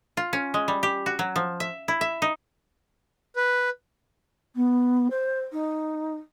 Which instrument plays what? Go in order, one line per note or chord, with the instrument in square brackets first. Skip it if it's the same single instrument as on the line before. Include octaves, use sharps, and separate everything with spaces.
[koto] F4
C#4
G#3
G3
G4
F#4
F#3
F3
E5
E4
E5
D#4
[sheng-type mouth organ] B4
[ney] B3
C5
D#4